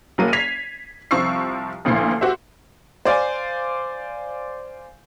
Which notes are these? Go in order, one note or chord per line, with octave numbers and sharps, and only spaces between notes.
F#1 F#3 A#3 D#7
G#6 B6 C7 F7
C2 F3 C4 C#6 E6 C7
A1 D2 A#2 F3 E4 C7
F#4 G4 C5 E5
C5 D5 F5 G#5